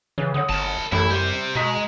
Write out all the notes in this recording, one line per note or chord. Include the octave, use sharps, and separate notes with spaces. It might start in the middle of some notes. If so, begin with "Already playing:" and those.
C#3 E3 C#4
D3 C#5 F#5 D#6
G1 A#4 A5
A1 F#2 E4 A4
G3 G4 C5
B2 G#3 A#5 D#6 B6